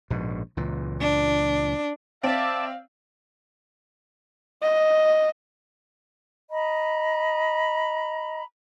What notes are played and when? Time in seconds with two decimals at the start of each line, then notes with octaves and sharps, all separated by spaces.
0.10 A#1 G#2 B2
0.57 C#2 A#2 E3
1.01 D4
2.23 C4 D5 E5 F5 A5
4.62 D#5
6.50 D#5 A#5 B5